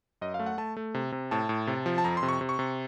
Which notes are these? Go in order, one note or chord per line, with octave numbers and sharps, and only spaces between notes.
F#2 D#5
F5
A3
F#5
A3 A5
A3
C3
C3
A2 A5
A2
C3
F3
A5
F2 A#5
C6
C3
C#6
C3
C#6
C3